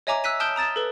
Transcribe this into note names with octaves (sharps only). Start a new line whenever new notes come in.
C#5 D#5 E5 G#5 A#5 D6
E6 F#6 B6 D#7
A5 D#6 F6 G6 D7 G7
A#5 D#6 A6 E7
A4 B4